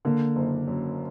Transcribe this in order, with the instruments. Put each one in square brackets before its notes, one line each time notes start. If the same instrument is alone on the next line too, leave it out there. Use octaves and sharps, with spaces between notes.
[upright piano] D3 [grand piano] A#3
[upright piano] F#1
F#2